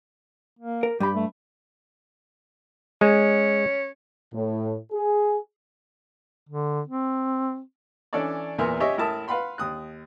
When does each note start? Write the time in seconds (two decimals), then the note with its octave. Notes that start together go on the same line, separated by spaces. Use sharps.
0.59 A#3
0.83 A#4
1.00 G2 G4 B5
1.15 A3
3.01 G#3 C#4
4.33 A2
4.92 G#4
6.49 D3
6.88 C4
8.13 E3 C#4 D4 A4 C#5 D5
8.58 E2 A#2 B3 A#4 E5 C6
8.80 G4 C#5 D#5 E5 G#5
8.98 A1 E4 A#4 E5 A5 D#6
9.28 B4 F5 F#5 B5 C6
9.58 D#2 D#6 F#6